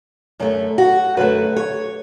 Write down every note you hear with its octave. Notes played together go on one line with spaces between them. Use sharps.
F#2 D3 A3 A4
F#4
F#2 D3 A3 B4
C#5